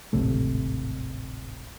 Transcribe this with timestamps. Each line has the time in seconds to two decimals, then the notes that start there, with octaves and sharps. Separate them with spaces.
0.13 D1 G#1 C3 A3